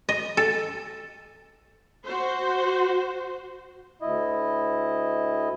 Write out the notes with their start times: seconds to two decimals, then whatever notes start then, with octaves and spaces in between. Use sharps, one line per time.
0.09 D#5
0.37 A4
2.06 F#4 C5
4.02 D2 E4 D#5